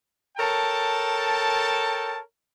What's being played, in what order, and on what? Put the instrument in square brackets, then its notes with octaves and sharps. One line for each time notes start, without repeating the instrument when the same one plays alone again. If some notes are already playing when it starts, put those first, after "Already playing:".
[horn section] A4 A#4 C#5 G5 A5